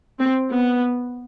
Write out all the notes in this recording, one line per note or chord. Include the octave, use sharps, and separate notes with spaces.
C4
B3